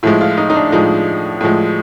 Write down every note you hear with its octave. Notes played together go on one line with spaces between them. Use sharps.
A2 F3 G#3 E4
F4
D#4
D#4
D4
A2 F3 G#3 D#4
A2 F3 G#3